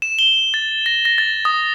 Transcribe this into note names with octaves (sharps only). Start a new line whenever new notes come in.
E7
G7
A6
A#6
A#6
A6
D#6